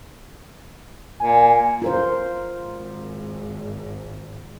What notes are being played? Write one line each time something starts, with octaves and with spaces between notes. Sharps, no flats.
A#2 G#5
F4 A#4 C5
G#1 G#2